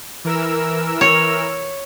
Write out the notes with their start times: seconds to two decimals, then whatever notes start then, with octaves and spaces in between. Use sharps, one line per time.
0.24 E3 A#4 E6
1.01 C#5